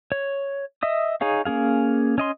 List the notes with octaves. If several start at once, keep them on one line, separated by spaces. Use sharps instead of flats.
C#5
D#5 E5 D#6
D#4 G#4 C#5 F5
A#3 C#4 G#4 F5
C#4 D#5 C6